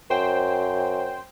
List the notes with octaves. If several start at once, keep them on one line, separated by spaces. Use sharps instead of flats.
F#2 C5 G5